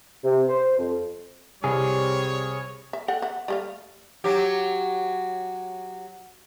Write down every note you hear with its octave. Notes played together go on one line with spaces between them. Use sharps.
C3
C5
F2
C2 G3 C4 G#4 C#5
E5
A4 F#5 G5
E5 F#5
G3 A3 F5
F#3 G4